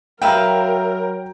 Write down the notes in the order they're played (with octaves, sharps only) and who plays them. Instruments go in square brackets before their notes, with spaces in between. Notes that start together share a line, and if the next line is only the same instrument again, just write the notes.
[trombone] F#3 [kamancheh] A#4 [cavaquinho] B4 E5 F5 [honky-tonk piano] G5 A#5 G6